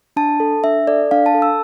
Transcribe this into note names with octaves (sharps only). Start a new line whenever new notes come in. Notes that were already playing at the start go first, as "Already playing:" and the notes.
D4 A5
A4
D4 E5
A4 D5
D4 F5
A5
A4
E6